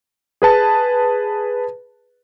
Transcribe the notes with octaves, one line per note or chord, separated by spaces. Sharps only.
G#4 B4 A5